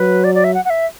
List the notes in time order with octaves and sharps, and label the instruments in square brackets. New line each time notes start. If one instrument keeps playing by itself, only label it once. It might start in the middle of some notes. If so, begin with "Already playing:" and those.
Already playing: [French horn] F#3 [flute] B4
[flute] D5
D5
E5
F#5
F#5
E5